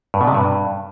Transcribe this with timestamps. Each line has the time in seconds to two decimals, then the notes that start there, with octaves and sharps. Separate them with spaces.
0.14 G2
0.21 B2
0.28 C3
0.34 G2